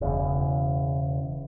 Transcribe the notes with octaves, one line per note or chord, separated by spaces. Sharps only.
E1 E2 C#3